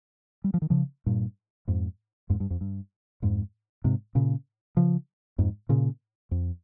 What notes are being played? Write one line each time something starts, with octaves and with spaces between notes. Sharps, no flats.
G3
F3
D#3
C#3 F3
G2 A#2
F2 G#2
F2 G#2
G2
F2
G2
F2 G#2
G#2 C3
A#2 C#3
C#3 F3
F2 G#2
A#2 C#3
F2